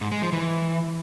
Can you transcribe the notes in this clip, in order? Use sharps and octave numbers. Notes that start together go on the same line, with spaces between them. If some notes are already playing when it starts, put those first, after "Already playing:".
G#2
G#3
F3
E3